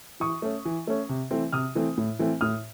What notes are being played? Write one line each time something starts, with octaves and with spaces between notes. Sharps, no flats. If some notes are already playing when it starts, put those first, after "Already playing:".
E3 C#6 D#6
A3 C#4
E3
A3 C#4
C3
E3 A3 C4
C3 D#6 F6
E3 A3 C4
A2
E3 A3 C4
A2 D#6 F6